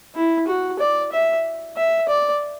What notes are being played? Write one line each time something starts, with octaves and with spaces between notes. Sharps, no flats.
E4
F#4
D5
E5
E5
D5